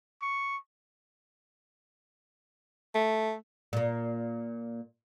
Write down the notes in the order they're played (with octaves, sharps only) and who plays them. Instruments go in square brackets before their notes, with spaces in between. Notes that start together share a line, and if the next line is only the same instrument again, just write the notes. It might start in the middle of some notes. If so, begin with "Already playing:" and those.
[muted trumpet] C#6
[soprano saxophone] A3
[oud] A#2 A#3